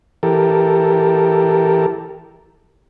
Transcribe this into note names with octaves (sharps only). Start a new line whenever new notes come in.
E3 G4 A4 A#4